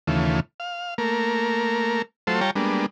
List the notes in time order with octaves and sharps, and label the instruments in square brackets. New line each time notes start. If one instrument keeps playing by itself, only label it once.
[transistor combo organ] D#2 C#3 E3 A3 F4
F5
A3 A#3 A#4
F#3 A3 F4 A4 C5
G3 F4 C#5 G5 A5 A#5
G3 G#3 A#3 B3 D4